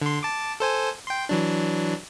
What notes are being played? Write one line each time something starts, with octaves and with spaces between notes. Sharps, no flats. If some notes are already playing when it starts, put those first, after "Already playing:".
D3 C6
A5 D6
A4 C5 G#5
G5 C6
E3 F#3 D4